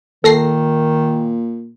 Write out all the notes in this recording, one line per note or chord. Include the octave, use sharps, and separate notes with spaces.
A#2 D#3 A4 A#6 C7